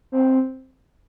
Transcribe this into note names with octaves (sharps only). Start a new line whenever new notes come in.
C4